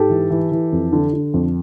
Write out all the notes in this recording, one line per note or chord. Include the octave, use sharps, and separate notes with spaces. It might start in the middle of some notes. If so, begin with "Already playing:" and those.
Already playing: G#2 G4 A4
E3
E3
E3
F2
D3
D3
F2